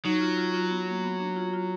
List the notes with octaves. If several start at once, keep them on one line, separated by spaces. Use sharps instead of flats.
F#3 D#4
F4
F4
F4
B3
A#3
B3
D4
F4
F4